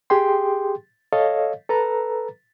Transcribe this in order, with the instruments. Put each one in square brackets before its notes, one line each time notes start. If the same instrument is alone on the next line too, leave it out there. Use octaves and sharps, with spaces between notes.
[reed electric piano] G4 G#4 G5 C6
A4 C#5 D#5 F5
A4 B4 A#5